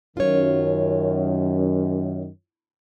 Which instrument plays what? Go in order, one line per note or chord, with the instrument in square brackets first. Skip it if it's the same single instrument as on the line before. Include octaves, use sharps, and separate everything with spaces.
[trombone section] F#2 D#3 [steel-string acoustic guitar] F4 C#5